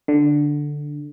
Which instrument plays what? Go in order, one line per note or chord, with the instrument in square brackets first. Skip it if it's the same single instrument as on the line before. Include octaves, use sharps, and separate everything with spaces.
[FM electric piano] D3